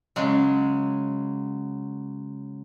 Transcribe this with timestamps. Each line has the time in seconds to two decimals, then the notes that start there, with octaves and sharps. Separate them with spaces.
0.16 C#3 F#3 G#3